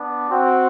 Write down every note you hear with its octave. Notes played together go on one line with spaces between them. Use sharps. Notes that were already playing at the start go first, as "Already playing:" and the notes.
Already playing: B3 D4
C4 F#4